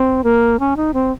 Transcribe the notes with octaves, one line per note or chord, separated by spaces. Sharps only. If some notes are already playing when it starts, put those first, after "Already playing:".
Already playing: C4
A#3
C#4
D#4
C4